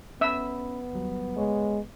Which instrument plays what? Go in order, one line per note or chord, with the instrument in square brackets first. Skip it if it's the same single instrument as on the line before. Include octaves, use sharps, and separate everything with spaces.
[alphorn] B3 [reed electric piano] C#4 B5 [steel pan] E5 E6
[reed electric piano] D#2 F#3 G3
[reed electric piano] C#2 C#5 [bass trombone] G#3